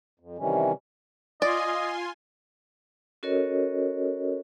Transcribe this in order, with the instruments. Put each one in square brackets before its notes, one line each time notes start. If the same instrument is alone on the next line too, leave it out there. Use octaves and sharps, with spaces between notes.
[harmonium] F2
C3 D#3 E3 G3 C#4
[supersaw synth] F4 G#5 C6 [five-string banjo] D5 [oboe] D#5
[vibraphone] C#4 F#4 A4 A#4 C#5 D#5